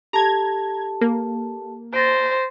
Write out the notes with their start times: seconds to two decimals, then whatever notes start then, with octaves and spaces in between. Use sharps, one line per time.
0.13 G4 A4 A5 A#5 G#6
1.01 A#3
1.93 C5 A6 A#6 D7